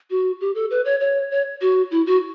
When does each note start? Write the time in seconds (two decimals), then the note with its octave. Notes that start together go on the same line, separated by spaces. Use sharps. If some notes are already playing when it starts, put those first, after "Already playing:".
0.10 F#4
0.41 G4
0.55 A4
0.71 B4
0.85 C#5
1.00 C#5
1.31 C#5
1.61 F#4
1.91 E4
2.06 F#4